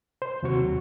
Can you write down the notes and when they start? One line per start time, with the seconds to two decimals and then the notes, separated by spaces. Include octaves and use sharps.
0.22 C5
0.43 D#2 C3 F#3 F#4 C#6